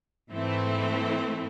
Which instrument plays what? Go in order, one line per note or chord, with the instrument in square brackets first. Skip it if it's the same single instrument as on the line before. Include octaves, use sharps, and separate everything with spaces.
[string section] G#2 E3 A3 C4 E4